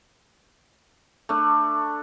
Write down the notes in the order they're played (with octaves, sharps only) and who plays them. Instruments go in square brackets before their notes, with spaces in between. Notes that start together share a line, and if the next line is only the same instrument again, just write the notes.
[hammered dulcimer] A3 D4